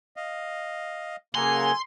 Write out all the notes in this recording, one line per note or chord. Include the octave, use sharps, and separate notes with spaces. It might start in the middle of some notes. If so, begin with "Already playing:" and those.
D#5 F5
C#3 F#3 A#3 A4 F#5 G#5 A#5 C6